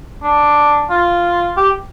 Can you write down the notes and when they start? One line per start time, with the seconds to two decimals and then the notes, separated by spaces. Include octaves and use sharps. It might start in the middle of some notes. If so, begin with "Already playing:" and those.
0.23 D4
0.90 F4
1.57 G4